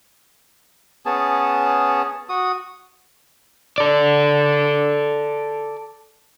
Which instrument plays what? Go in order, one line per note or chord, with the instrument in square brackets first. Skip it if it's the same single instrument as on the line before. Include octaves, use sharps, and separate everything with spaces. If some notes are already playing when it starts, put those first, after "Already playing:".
[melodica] B3 C#4 G#4 A5
F#4 D#6
[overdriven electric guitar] A4 D5